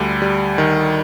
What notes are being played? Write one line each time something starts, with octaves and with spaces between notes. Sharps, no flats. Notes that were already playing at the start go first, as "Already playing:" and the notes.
Already playing: D2 D3 G3
G3
D#3